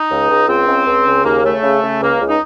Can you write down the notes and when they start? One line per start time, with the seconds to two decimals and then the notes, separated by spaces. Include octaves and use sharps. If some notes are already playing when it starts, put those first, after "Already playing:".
Already playing: D#4
0.10 C#2
0.29 C#2
0.48 C#2 C4
0.67 C#2
0.86 C#2
1.06 C#3
1.24 D#2 A#3
1.43 C#3 A3
1.63 C#3
1.82 C#3
2.01 C#2 A#3
2.21 C#2
2.29 D#4